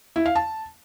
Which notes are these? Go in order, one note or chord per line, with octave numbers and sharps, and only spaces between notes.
E4
F5
A5